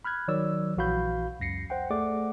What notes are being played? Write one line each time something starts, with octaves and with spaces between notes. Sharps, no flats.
B5 F6 F#6 G#6
D#3 F#3 C#5 D5 E6
A#1 E3 F#4 F5 B5 G6
C#2 F#2 A#6 C7 C#7
C5 F#5 G5
A3 G#4 D5 F#5 D6